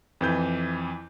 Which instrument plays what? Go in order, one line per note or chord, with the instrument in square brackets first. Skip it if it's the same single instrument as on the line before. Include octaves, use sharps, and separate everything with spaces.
[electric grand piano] F2 E3 G6